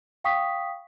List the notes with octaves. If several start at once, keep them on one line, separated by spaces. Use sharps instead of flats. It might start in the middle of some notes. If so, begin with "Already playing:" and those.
F5 G5 C#6 D#6 B6